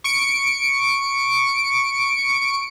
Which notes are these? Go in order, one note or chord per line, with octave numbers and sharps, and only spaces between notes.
C#6 C#7 D7